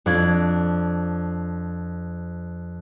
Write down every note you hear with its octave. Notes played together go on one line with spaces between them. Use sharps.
F2 D4 G#6